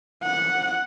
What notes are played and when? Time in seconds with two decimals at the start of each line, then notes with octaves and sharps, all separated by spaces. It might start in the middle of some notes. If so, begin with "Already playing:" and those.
0.23 F#5